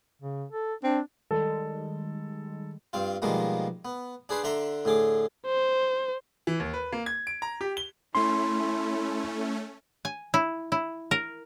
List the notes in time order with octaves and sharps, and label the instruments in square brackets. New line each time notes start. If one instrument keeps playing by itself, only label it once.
[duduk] C#3
A4
[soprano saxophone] C4 [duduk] D4
[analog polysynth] D#3 G3 G#3 [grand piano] A4
[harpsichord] G2 C4 F4
B2 D#3 F3 G3 G#3 A#3
B3
D4 G#4 B4 C5
D3 D4 E5 A#5 C6
A2 D3 G#4 D6
[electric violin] C5
[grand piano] E3
D#2
B4
A#3
G#6
D7
A#5
G4
G7
[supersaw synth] A3 C#4 [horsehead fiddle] E4 [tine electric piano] C6
[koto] G#5
E4
E4
A#4